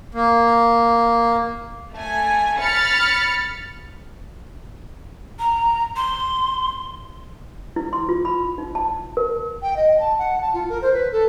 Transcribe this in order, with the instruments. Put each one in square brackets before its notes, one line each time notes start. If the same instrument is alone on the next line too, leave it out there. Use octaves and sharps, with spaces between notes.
[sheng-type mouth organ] A#3
[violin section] A3 G#5
B5 F6 A6 C#7
[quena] A#5
C6
[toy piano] E4
C6
F4
B5
D#4
A5
A#4
[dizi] G5
D#5
A5
F#5
A5
F4
A#4
C5
B4
A4